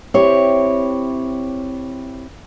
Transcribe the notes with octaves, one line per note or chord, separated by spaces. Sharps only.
C4 E4 G4 C#5